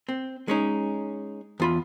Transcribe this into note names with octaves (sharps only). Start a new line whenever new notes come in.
C4
G#3 C#4 D#4
E2 F4 B5